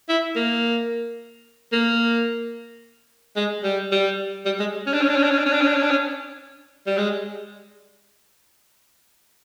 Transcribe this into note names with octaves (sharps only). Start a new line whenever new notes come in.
E4
A#3
A#3
G#3
G3
G3
G3
G#3
C#4
D4
C#4
D4
C#4
D4
C#4
D4
C#4
D4
C#4
D4
C#4
D4
C#4
G3
G#3